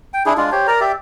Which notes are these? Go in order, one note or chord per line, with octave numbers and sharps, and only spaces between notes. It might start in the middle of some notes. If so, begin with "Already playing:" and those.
G5
D4 E4 G#4
G#3 D4 F4
G4 C5 C#5
A#4 D5 A#5
G4 D5 E5